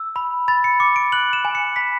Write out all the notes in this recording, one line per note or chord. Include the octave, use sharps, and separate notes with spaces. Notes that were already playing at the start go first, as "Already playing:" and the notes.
Already playing: E6
B5
B5 A6
C#7
D6 C#7
D7
F#6 F#7
E7
G#5
C#7
B5 B6